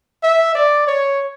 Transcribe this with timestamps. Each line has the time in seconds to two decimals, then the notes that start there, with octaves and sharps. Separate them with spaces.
0.23 E5
0.55 D5
0.87 C#5